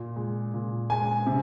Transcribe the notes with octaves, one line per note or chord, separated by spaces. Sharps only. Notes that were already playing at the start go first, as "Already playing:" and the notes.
Already playing: A#2
G#3
A#2
G#3 G#5
C3